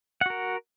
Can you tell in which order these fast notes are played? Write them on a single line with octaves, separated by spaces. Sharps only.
F#5 F#4 A#4